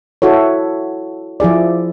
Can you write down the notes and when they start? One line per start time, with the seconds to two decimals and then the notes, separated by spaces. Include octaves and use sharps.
0.22 E4 F#4 A4 C#5
1.40 F3 E4 G#4 D5